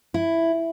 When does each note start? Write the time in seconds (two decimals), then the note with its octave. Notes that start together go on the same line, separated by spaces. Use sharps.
0.14 E4